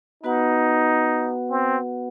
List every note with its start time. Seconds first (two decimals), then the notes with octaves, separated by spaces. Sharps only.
0.23 B3 D#4 F#4 B4 F#5
1.50 C4